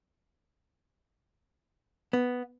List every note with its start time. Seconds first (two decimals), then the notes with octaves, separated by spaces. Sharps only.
2.13 B3